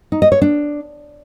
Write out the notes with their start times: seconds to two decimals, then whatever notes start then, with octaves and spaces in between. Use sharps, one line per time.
0.12 D#4
0.22 D#5
0.32 C#5
0.42 D4